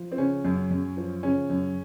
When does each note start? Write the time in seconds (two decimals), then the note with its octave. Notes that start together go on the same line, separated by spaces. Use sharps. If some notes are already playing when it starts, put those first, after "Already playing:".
Already playing: F3
0.12 C4
0.18 C#3 C#4
0.45 F#2
0.71 F#2
0.97 F3
1.23 C#3 C#4
1.50 F#2